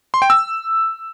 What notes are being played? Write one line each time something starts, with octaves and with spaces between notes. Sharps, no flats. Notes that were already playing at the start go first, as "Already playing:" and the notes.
C6
G5
E6